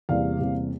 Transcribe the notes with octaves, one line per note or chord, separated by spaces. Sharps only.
E2 C3 G3 A#3 D5 F5
E2 C3 G3 A#3